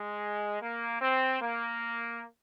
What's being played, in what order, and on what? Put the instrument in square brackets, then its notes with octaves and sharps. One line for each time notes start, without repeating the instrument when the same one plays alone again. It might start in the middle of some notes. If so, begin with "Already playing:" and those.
Already playing: [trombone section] G#3
A#3
C4
A#3